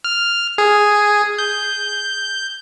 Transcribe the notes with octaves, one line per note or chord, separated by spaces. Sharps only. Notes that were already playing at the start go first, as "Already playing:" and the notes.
F6
G#4
G6